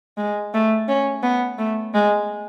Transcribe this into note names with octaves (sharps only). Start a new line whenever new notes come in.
G#3
A3
C#4
B3
A3
G#3